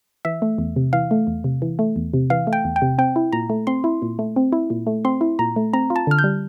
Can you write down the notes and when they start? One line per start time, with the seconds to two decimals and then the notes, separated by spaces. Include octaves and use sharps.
0.25 E3 E5
0.42 A3
0.58 E2
0.76 C3
0.93 E3 F5
1.11 A3
1.27 E2
1.44 C3
1.62 E3
1.79 A3
1.96 E2
2.14 C3
2.30 E3 F5
2.47 A3
2.53 G5
2.65 E2
2.76 G5
2.82 C3
2.98 C4 G5
3.16 E4
3.32 A#2 A#5
3.50 A3
3.67 C4 C6
3.84 E4
4.02 A#2
4.19 A3
4.36 C4
4.52 E4
4.70 A#2
4.87 A3
5.05 C4 C6
5.21 E4
5.39 A#2 A#5
5.56 A3
5.73 C4 A#5
5.90 F4
5.96 A5
6.07 D3 F6
6.18 G6
6.24 G3